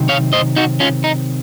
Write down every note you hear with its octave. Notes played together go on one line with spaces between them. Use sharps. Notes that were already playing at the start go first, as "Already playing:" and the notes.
Already playing: C3 D#3 F#3 C4
C#5 F5
C5 D#5
D#4 F#4
C#4 F4
D#4